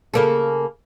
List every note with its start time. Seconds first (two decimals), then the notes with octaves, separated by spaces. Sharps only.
0.14 C#3 A#3 A4